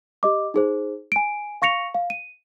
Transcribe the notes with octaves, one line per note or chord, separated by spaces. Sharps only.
G4 D#5 D6
D#4 G#4 C5
G#5 D7
F5 C#6 A#6 C#7 F7
F5
D#7